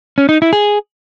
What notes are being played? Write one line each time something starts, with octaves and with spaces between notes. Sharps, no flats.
C#4
D#4
E4
G#4